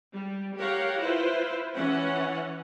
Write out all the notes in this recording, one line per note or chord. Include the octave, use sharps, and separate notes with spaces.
G3
G4 A#4 C#5 F5 F#5
E4 F4 B4 C5
E3 C#4 F#5